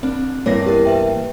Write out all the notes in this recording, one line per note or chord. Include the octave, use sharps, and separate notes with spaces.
C4 D4
E2 G2 A#3 C#5 A#6
G4 A#4
B4 E5 G5